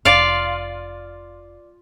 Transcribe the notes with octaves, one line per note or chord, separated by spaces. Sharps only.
F1 F4 D5 F5